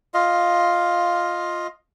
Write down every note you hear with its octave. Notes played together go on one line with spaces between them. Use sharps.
F4 D#5 F5